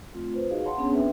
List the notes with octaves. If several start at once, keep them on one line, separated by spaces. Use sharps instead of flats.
A3 C4 F4
B4 C5
D#4 F#4 G#4 B4 D#5 F5
C#5 F#5 A5 B5 C6
B3 C#4 D4 G#4
C4 D4 B4 E5 G5